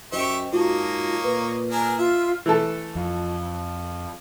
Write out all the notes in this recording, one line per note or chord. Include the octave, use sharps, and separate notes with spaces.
F#2 G4 C5 D#5 E5 G5 C#6
G#2 A#3 F4 F#4 C#5 D#5 A5
A#2 B4
D4 G#4 A#4 G#5
F4 E5
E3 A3 A4
F2